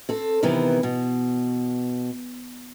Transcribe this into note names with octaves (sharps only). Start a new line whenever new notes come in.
C4 A4
C3 D#3 E3 B3
B2